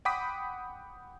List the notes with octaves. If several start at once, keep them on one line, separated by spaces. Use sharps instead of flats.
F#5 G5 B5 D6 D#6 B6